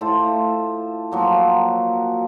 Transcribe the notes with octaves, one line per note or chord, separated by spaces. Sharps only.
A2 F4 A4 C5
F3 F#3 A#3